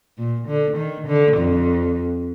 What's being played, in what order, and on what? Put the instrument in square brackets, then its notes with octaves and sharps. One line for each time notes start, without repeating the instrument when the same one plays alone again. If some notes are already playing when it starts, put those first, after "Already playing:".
[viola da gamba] A#2
D3
D#3
D3
F2